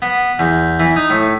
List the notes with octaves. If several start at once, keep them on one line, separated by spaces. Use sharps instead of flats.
B3
E2
E3
D#4
A2